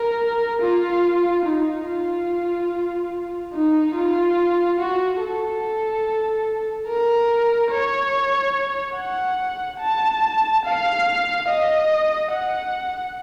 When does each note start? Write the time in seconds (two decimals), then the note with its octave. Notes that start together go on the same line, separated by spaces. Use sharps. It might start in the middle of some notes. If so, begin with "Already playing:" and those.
Already playing: A#4
0.62 F4
1.45 D#4
1.86 F4
3.54 D#4
3.95 F4
4.80 F#4
5.22 A4
6.88 A#4
7.72 C#5
8.97 F#5
9.81 A5
10.65 F5
11.47 D#5
12.32 F#5